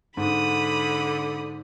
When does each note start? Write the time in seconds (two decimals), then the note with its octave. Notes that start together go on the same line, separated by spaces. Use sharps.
0.17 G#2 D3 B5 D#6